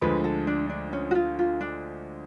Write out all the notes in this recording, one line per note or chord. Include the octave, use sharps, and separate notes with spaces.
D2 D3 F3 G#3 B4
A4
D4
D4
C#4
F#4
F4
F4
D4